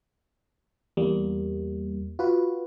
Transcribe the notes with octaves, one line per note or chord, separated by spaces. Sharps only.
E2 G3 A#3
F4 F#4 B4